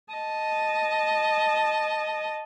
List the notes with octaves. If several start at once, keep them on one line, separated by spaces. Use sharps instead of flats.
D#5 A5